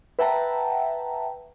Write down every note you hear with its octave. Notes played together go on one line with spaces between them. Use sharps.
B4 E5 F#5 G5 A5 A#5